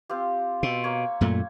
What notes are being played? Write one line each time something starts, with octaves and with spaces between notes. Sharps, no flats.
C4 F4 G4
B2 C4 C#6 E6
A#3 C#5
F#2 A#2 A3